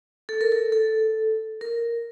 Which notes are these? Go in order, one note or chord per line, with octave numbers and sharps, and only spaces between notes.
A4
A#4
A4
A4
A#4